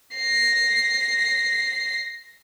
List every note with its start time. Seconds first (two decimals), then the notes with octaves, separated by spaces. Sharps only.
0.15 A#6 C7